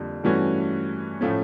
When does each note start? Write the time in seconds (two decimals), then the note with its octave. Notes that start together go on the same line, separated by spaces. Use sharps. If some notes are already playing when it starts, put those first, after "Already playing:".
Already playing: F2 D3 G3 A#3
0.24 G2 E3 A3 C#4 F#4
1.21 A2 F3 A3 C#4